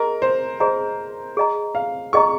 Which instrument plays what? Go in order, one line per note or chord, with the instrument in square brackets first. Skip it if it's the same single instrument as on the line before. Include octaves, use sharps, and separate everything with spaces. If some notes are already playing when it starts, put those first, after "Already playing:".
Already playing: [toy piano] G#4 D#5 A#5 [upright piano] A#4
[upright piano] C5
[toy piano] G#4 D#5 A#5 [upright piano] C5
[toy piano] G#4 D#5 A#5
[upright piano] F5
[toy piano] G#4 D#5 A#5 [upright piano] C#6